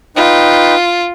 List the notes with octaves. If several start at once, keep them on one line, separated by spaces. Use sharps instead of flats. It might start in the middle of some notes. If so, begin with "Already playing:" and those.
D#4 F4 B4 G5